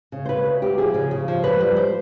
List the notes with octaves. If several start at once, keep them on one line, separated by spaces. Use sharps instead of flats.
C#3
C5
C#3 B4
D2
D2 G4
F3 G#4
C#3
C#3
F3
F#2 B4
G3
C5